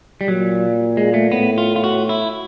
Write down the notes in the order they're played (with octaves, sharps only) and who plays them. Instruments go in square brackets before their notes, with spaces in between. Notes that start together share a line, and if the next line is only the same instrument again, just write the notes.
[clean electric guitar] G3
[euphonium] A#2 [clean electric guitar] F#3
[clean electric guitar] G#3
A3
[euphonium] A2 [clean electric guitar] B3
[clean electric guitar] F4
F4
F#4
E4